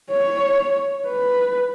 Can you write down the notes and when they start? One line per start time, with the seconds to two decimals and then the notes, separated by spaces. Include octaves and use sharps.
0.11 C#5
1.08 B4